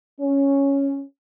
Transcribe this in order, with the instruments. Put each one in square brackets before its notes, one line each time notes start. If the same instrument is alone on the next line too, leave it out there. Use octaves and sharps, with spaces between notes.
[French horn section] C#4